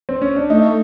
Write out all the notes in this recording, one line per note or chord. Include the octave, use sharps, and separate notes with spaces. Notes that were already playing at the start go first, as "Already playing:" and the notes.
C4
C#4
D4
A3 D#4